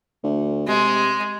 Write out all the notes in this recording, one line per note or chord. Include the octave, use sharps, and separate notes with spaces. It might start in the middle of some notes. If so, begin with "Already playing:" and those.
D2
C3 G#3